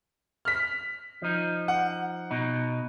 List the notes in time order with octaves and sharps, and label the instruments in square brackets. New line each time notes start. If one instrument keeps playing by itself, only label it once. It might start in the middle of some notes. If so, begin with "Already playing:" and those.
[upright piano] F6 B6
[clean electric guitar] F3 D#4
[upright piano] F#5
[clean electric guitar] B2 D#4